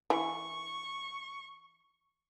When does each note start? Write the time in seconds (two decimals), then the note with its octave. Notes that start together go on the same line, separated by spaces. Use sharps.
0.10 E3 C#6